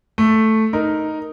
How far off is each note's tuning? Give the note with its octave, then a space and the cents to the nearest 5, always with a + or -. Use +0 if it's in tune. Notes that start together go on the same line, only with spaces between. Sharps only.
A3 +0 A4 +0
D#4 +0 A#4 +0